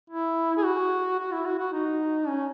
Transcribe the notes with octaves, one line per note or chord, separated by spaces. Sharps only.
E4
G#4
F#4
F#4
E4
F#4
F#4
D#4
C#4